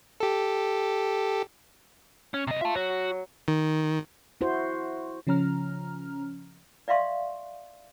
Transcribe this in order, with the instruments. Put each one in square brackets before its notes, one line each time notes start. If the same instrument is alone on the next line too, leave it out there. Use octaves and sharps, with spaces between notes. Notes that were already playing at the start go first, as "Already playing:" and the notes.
[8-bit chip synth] G4 A4
[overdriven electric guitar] C#4
C3 D#5
[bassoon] F4 [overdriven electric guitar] E5 A5
[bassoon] F#3 [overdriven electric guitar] F#4
[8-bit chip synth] D#3
[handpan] E4 F#4 C5
[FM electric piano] C#3 F3 C#4 A#5 F6
[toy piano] D5 E5 F5 C6 C#6